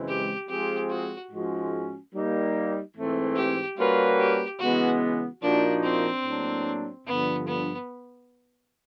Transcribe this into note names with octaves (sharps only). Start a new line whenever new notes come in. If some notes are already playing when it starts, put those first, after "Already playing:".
Already playing: F#2 C#3 E3 G#3 C4
G4
F3 G#3 C4 F4 G4 G#4
F#4
G#2 F3 G#3 C#4 F#4
G3 A#3 D#4
G#2 E3 A3 C4
G4
G3 A#3 C#4 F4 F#4 B4
G4
C#3 E3 G#3 B3 F#4
A#2 F3 A#3 D4 D#4 F#4
C4
A2 F#3 A#3 D4
G2 D3 F3 B3
B3